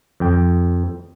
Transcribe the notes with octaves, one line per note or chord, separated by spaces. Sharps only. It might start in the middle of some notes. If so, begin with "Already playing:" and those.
F2 G5